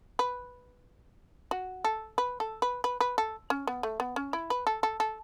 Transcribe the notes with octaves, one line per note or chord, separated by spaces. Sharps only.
B4
F#4
A4
B4
A4
B4
B4
B4
A4
C#4
B3
A3
B3
C#4
E4
B4
A4
A4
A4